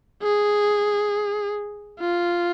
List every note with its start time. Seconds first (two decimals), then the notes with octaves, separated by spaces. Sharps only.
0.23 G#4
2.00 F4